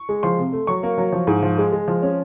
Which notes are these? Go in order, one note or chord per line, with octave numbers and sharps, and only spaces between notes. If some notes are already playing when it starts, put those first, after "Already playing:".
Already playing: C#6
G#3
F3 C6
C3
A3
F#3 C#6
A#3
F#3
F3
G#2
F3
G#3
G#3
F3
C#4